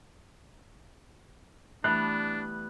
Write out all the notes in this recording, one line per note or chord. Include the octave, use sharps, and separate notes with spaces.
E3 G3 A3 B3 D4 F#6